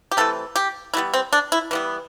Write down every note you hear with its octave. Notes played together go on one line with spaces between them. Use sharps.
G4
C3 E3 A3 A4
G4
E3 G3 B3 E4
C4
D4
E4
E3 G3 B3